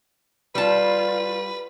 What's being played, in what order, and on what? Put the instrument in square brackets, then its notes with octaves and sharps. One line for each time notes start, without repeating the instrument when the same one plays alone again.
[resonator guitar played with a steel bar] G3 A5 [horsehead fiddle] F4 [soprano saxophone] B4